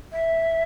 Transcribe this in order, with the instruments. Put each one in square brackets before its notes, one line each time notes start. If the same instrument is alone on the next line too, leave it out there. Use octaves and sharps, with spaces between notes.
[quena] E5